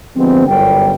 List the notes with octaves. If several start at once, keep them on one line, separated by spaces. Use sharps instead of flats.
D3 F3 G3 G#3 B3 C4
G1 F#2 G3 G5